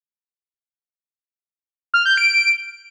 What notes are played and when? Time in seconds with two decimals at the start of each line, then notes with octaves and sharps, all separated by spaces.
1.94 F6
2.06 G6
2.17 D7